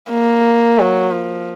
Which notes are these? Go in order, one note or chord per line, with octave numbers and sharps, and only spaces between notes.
A#3
F#3
F3